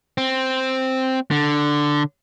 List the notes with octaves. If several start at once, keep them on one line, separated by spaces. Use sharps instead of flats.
C4
D3